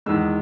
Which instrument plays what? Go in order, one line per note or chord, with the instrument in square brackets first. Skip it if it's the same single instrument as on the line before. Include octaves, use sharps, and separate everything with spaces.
[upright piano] E2 D#3 G#3 E6